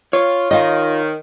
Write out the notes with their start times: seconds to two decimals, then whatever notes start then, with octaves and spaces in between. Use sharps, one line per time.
0.13 F4 C#5
0.51 D#3 F4 D#5